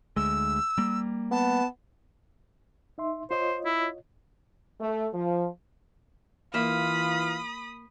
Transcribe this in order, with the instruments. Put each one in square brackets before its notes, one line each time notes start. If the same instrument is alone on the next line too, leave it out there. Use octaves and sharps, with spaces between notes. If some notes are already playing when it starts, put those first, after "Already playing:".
[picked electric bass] D2 G#3 [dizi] E6
[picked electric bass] G3 A#3
[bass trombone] B3 [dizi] A5
[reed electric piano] D#4 E5 C6
[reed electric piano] F4 C#5 D#5 [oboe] C5
[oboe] E4
[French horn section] A3
F3
[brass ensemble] E3 F4 [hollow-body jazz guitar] A#3 E5 [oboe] F5 [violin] B5 D#6